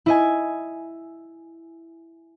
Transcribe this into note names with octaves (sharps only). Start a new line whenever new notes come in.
E4 D#5 G#5